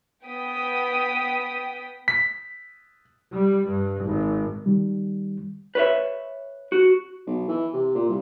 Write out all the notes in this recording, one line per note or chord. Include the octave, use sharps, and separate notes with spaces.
B3 G5 D#6 B6
B6
G3
G2
G#1
D#3 G3
B4 C#5 E5
F#4
B1
E3
C3
A#2
C2